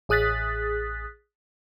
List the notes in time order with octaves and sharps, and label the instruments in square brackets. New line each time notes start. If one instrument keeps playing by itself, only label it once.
[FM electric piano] A1 G#4 D#6 F#6 A6 B6